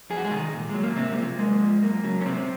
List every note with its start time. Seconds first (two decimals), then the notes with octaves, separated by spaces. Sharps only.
0.10 F2 G#4
0.17 F#4
0.25 G#3 G#4
0.31 C3 D#3 D#4
0.53 A#2
0.69 F#3 G#3
0.83 A#3
0.96 G#2 C3 C4
1.12 G#3
1.18 F3 A#3
1.39 F#2 G#3
1.60 F3
1.82 F#2 A#3
2.04 C#3 F#3
2.21 C#4
2.25 F#2 C3 C4